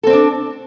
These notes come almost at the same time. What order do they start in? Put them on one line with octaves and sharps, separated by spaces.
A4 C4 D5 D4